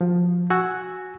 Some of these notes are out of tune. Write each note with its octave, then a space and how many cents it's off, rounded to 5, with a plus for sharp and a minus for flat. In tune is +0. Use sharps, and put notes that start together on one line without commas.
F3 +15 F#4 +35
F#4 +0 G#5 +0 E6 +0